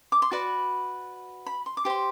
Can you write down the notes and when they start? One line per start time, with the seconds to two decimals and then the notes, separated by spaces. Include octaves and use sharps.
0.12 D6
0.22 C6
0.32 F#4 B4 D5 B5
1.46 B5
1.66 C6
1.77 D6
1.85 G4 C5 C6